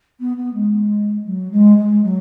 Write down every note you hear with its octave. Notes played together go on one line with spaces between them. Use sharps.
B3
B3
G#3
F#3
G#3
G#3
F#3